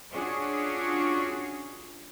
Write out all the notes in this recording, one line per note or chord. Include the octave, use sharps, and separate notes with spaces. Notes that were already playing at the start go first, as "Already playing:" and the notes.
C#4 D4 F4 F#4 G#4 C#5